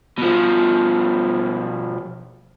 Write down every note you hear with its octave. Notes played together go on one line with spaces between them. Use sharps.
B2 F3